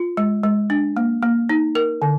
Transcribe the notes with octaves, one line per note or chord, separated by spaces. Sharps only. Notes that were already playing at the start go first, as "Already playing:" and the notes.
Already playing: F4
G#3
G#3
D4
A#3
A#3
D#4
A#4
D3